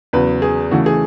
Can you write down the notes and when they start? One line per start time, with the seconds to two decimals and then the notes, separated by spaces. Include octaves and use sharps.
0.13 E2 C#3 F#3 B4
0.42 G#4
0.71 C#3 E3 A3 F#4
0.86 G#4